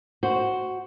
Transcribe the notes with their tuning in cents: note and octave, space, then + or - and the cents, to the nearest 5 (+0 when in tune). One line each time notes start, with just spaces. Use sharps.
F#4 +5 C5 +0